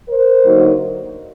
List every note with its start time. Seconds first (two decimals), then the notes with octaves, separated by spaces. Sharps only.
0.08 A#4 C5
0.45 D2 D3 F#3 A#3 D#4